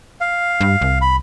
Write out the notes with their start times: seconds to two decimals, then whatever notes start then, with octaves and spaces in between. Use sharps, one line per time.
0.21 F5
0.61 G2
0.81 C2
1.01 B5